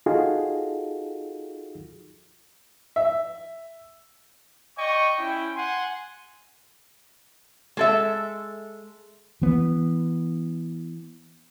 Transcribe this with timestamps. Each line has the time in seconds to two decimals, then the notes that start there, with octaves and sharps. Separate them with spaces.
0.06 D#4 F4 F#4 G#4 A4
2.96 E5
4.78 D5 D#5 G5 C#6
5.19 C#4 E4 G5
5.56 F#5 G#5 C6
7.77 G#3 A4 E5
9.42 E3 B3